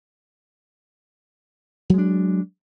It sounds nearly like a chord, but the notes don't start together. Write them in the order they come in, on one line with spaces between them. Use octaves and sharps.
F#3 G#3 D4